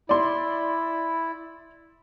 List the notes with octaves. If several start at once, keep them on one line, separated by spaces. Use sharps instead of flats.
E4 D5 C6